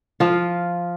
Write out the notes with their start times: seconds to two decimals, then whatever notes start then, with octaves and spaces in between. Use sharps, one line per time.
0.20 F3 F4